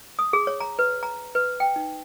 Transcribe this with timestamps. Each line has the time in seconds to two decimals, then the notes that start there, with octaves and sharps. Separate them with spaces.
0.19 D#6
0.33 G#4
0.47 C#5
0.60 A#5
0.79 B4
1.03 A#5
1.35 B4
1.60 G5
1.76 D#4